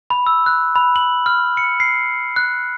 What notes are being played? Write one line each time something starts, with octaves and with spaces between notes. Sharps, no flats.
B5
E6
F#6
B5
F#7
F6
C#7
C7
F#6